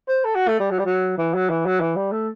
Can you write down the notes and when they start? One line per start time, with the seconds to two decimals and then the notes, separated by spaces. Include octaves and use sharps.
0.08 C5
0.25 A4
0.35 F#4
0.48 A3
0.60 G3
0.71 F#3
0.79 G3
0.85 F#3
1.18 E3
1.35 F#3
1.50 E3
1.66 F#3
1.81 E3
1.96 G3
2.12 A3